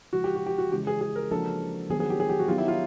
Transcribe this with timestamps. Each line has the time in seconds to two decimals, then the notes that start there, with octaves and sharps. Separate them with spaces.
0.13 C#3 F3 G#3 F#4
0.24 G4
0.35 F#4
0.46 G4
0.58 F#4
0.71 C#3 E3 G#3 C#4 E4 G4
0.87 G#4
1.01 G#4
1.16 A#4
1.31 F3 A#3 D4 F#4 A4 A#4
1.90 D#3 F#3 B3 G#4
2.00 G#4
2.10 G4
2.20 G#4
2.29 G4
2.39 F#4
2.48 F#3 B3 D#4 F4 G4
2.58 E4
2.68 F4